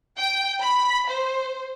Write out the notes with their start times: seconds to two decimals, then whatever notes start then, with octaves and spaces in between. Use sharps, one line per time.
0.18 G5
0.59 B5
1.09 C5